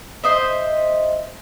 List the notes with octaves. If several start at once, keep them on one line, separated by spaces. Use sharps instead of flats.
C5 D#5 E5